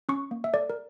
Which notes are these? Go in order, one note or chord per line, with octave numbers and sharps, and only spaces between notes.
C#4 C#6
A#3
E5
A4 D5
A#4